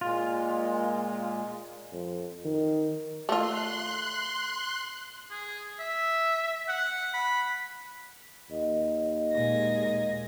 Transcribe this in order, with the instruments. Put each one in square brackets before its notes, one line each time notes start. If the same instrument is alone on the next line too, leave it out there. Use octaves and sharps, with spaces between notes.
[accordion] A#2 G#3 [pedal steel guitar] F4
[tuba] F2
D#3
[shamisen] A3 F4 [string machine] C6 F#6
[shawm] G#4
E5
F#5
B5
[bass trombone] D#2 [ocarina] D#5
[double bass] A#2 G#3 [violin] G#4 A#6